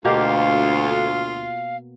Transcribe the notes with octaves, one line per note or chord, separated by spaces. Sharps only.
D2 B2 A#3 F4 G4 F5